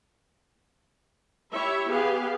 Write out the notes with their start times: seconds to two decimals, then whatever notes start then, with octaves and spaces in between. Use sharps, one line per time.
1.54 E4 G4 C#5 E5
1.91 B3 G4 G#4 F5